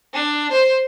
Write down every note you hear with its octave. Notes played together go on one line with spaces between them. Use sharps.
D4
C5